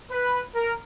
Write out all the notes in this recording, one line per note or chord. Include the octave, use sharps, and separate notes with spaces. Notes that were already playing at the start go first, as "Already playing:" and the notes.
B4
A#4